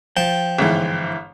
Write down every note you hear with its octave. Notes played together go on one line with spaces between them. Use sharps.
F3 G5 A5
G1 G#2 E3